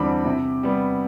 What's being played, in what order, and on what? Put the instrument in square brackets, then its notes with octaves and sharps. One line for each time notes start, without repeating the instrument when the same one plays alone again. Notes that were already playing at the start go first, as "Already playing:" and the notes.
Already playing: [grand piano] E2 D3 G3 C4 B5 D6
C3
G3 B3